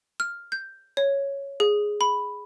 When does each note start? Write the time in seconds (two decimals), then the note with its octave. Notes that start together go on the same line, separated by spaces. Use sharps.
0.20 F6
0.52 G6
0.97 C#5
1.60 G#4
2.01 B5